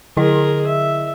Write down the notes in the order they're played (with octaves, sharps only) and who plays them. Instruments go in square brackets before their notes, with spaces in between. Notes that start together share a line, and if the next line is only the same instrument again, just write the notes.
[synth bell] D3 E4 D#5 [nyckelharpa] G#4 A#4
[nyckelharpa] E5